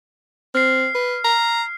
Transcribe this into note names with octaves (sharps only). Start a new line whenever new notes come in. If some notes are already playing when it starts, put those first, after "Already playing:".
C4 F6 C7
B4
A#5